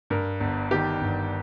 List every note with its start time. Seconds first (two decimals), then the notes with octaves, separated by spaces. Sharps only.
0.10 G2 A#4
0.40 G1
0.71 D#3 G4
1.01 G1